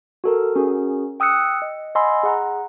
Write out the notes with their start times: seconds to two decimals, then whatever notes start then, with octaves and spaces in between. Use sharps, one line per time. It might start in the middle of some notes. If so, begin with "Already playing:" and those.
0.24 F#4 A4 A#4
0.56 C#4 F#4 G#4 A#4
1.20 G5 D#6 E6 F#6 C#7
1.62 D#5
1.95 D#5 F#5 G#5 B5 C6 E6
2.23 G#4 F#5 A#5